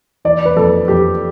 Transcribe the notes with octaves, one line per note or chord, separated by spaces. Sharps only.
E3 D5
B4
F2 A4
F2 G4